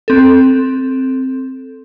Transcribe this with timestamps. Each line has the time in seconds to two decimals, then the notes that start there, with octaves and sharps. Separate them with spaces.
0.08 C4 A4